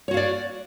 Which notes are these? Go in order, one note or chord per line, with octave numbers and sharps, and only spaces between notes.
F#4 C#5 D5 F5